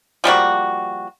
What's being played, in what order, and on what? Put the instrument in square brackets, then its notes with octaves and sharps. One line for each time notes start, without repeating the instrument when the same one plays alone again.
[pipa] F3 G3 A#3 F#4